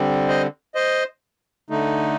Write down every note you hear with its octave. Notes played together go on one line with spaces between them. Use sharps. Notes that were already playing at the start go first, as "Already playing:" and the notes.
Already playing: D3 G3 C4
C5 D#5
C5 D#5
D3 A3 D#4